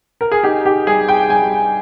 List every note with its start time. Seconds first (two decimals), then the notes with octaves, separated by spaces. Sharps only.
0.21 A#4
0.32 G#4
0.43 D#4 G4
0.65 G4
0.87 G3 G#4
1.08 G5
1.30 G3 G#5